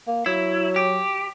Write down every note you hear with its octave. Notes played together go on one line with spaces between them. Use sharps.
A#3
F#3 E4
G4